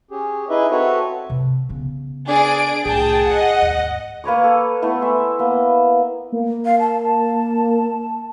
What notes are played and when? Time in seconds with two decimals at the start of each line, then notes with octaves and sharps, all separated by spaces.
0.11 C#4 G4 G#4
0.50 D#4 E4 G#4 B4 D#5 E5
0.71 C4 F#4 A4 B4 C#5 E5
1.30 C3
1.69 C#3 B3
2.28 D4 G#4 D5 D7
2.86 C2 A2 G#4 G5 A5
3.27 F4 D#5 F#5
3.62 D#2 G#2
4.24 A#3 B4 C#5 D6
4.44 A4
4.82 A3 B3 E4
5.01 E5 G#5 C6
5.39 A#3 B3
6.32 A#3
6.65 F5
6.79 A5